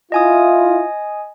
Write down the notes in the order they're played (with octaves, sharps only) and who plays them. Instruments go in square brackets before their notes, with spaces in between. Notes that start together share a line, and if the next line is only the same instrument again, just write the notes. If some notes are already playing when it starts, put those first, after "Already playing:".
[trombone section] E4 F4 [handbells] D#5 G#5 D#6